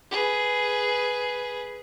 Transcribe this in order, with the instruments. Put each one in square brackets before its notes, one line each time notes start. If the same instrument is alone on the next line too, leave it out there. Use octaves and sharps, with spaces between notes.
[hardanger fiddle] G#4 B4